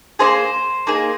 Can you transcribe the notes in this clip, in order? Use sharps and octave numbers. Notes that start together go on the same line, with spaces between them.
A#3 D#4 G#4 C5
A#3 D#4 G#4